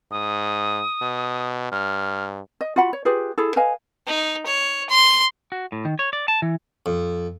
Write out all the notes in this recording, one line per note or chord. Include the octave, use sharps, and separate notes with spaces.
G#2 D#6
B2
G2 F6
D#5
F4 F#4 F#5 B5
C#5
F4 G4 G#4 B4
E4 G#4 A4
B4 D#5 F5 G#5
D#4
C#5
C6
F#4
A2
D#3
C#5
D5
A5
E3
F2